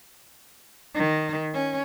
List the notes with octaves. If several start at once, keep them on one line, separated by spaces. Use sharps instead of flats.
D#3
C#4